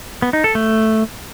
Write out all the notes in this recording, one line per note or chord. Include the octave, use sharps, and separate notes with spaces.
B3
D#4
A4
A3